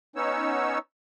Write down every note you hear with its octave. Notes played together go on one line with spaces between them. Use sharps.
B3 C#4 D#4 C#5 E6